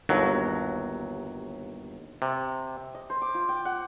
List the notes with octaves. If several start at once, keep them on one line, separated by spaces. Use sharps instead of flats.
G1 D#2 F#3
C3
D#5
C5
D6
F4
G5
F#5